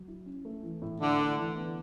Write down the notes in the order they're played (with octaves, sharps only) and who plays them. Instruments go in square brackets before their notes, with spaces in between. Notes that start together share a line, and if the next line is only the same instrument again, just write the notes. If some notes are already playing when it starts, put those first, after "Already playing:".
Already playing: [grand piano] F#3
E4
C#4
A3
E3
A2
[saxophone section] D3 [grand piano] E4
[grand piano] A3
E3
B3